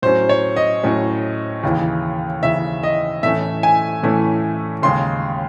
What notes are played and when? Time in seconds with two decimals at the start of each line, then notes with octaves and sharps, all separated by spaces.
0.02 A2 F#3 C#4 C5
0.29 C#5
0.56 D#5
0.83 A2 F#3 C#4
1.63 D#2 C#3 E3
2.42 D#2 C#3 E3 E5
2.83 D#5
3.23 A2 E3 A3 C#4 E5
3.63 G#5
4.03 A2 E3 A3 C#4
4.82 D#2 C#3 G#3 C6